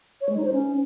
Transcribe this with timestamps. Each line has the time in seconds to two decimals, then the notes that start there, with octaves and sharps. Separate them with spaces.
0.21 C#5
0.29 G#3
0.37 D#4
0.45 C5
0.53 C#4